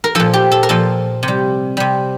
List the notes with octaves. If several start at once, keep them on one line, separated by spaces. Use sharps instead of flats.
A#4
A#2 F3 A4
G4
A4
A#4
A#2 F3 A4
C3
G3
C3 G3